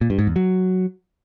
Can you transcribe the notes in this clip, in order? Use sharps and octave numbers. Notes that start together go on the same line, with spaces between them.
A#2
G2
G#2
E2
F#3